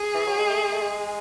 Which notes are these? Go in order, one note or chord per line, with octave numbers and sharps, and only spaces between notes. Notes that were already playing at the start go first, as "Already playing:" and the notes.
Already playing: G#4
E3
F#3
G#3
A3
G#3
A3
G#3